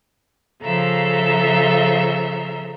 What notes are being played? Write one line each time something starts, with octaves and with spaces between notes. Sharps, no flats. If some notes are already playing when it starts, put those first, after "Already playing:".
C#3 F3 A4 E5 A#5